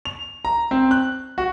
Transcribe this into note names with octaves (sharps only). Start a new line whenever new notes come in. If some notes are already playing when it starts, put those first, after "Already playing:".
F7
A#5
C4
F#6
F#4